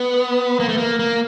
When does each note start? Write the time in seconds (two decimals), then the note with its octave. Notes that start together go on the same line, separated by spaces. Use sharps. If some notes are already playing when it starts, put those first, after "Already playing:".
Already playing: B3
0.60 A#3
0.69 A3
0.78 A#3
0.99 A#3